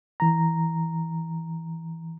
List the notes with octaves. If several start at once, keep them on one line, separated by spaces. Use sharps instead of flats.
E3 A#5